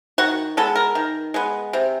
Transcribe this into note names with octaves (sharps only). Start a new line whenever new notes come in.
D#3 F#4
G#3 B3 A4
A#4
D#3
G#3 B3
C3